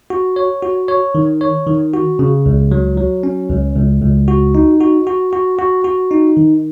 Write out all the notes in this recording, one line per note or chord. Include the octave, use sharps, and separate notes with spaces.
F#4
C#5
F#4
C#5
D#3
C#5
D#3
F#4
C#3
C#2
F#3
F#3
C#4
C#2
C#2
C#2
F#4
D#4
F#4
F#4
F#4
F#4
F#4
D#4
D#3